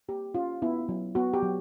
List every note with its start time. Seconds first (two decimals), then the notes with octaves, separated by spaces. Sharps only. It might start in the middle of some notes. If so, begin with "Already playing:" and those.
0.08 A#3 G4
0.35 C#4 F4
0.62 B3 E4
0.89 F#3
1.15 B3 F#4
1.33 G4
1.43 F#3